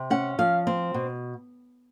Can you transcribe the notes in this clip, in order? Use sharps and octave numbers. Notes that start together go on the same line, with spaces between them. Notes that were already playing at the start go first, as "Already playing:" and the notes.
Already playing: C3
C#4 F#5
F3 F5
C4
B2